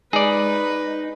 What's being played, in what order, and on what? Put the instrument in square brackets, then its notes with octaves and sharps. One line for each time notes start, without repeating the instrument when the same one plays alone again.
[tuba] G#3 [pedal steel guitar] D#4 [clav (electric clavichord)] G#4 D5 [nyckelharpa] B4